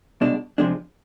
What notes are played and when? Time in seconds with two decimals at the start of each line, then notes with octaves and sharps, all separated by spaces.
0.21 C2 B2 G#3 D4
0.58 F2 C3 F3 G#3 D4